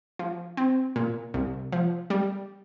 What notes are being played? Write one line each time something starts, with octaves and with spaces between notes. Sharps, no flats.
F3
C4
A#2
C2
F3
G3